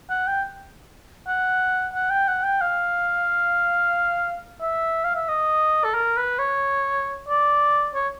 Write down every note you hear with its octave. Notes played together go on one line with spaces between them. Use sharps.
F#5
G5
F#5
F#5
G5
F#5
G5
F5
E5
F5
E5
D#5
A4
A#4
B4
C#5
D5
C#5